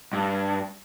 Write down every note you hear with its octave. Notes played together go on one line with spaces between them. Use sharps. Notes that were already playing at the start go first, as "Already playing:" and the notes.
G2